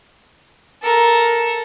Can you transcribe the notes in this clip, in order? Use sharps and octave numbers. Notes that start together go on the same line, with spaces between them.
A4 A#4